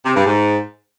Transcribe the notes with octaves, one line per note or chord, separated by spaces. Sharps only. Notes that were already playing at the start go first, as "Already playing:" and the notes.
C3
G2
G#2